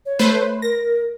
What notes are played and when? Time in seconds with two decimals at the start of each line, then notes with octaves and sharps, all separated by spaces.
0.06 C#5
0.19 A3 B4 C5
0.62 A#4 A#6